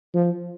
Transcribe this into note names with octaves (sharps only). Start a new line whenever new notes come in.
F3